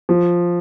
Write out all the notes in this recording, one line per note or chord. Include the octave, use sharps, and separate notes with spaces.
F3